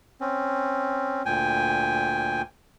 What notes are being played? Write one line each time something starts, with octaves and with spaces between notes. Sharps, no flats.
C4 C#4
D2 A#2 G5 G#5